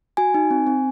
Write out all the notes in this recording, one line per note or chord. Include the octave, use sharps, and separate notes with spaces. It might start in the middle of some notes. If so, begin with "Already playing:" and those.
F#4 G#5
D#4
C4
C4